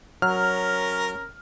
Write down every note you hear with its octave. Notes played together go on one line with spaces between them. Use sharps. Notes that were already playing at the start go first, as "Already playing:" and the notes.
F#3 C#4 A#4 F6